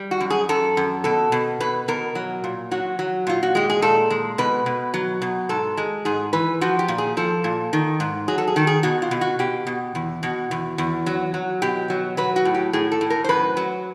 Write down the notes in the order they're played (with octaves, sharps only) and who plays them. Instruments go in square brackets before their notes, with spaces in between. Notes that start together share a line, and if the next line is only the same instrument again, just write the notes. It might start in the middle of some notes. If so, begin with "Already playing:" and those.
Already playing: [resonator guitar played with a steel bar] G3
F#4
F#2
G#4
F#2 A4
F#2
B2 A4
B2
B2 B4
B2 A#4
F#3
A#2
F#3 F#4
F#3
A#2 F4
F#4
G#3 G4
G#4
A#2 A4
G#3
B2 B4
B2
F#3
B2
G#2 A4
G#3
G#2 G#4
E3 B4
F3 F#4
G4
A#2
G#4
F3 A4
A#2
D#3
G#2
F#3 G#4
A4
G#4
D#3 A4
G#4
B2 F#4
F4
B2
F#4
B2 G4
B2
E2
B2 F#4
E2
E2
F#3
F#3
B2 G4
F#3
F#3 B4
F#4
A2
G4
A2 G#4
A4
A2
A#4
C5
F#2 B4
F#3